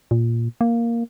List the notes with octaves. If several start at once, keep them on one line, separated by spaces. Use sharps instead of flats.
A#2
A#3